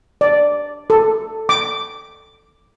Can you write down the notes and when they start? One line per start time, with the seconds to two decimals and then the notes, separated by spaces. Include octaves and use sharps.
0.21 D5
0.90 A4
1.49 D6